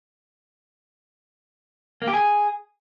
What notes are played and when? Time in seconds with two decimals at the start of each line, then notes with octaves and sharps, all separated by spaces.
2.02 A#3
2.08 G4
2.14 G#4